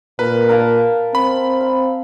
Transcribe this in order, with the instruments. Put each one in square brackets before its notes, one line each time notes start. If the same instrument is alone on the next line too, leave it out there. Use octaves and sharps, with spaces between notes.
[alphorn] A#2 [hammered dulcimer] A#4 [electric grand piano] B4
[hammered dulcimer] A#4 F5 A5
[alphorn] C4 [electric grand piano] B5
[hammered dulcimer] F5